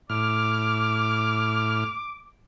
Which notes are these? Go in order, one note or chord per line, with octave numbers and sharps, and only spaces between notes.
A2 D6 F6